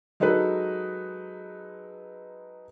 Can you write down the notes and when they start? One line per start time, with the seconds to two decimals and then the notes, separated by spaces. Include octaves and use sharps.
0.20 F#3 G#3 D#4 A4 B4